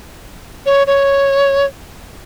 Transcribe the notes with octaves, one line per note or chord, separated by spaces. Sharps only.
C#5
C#5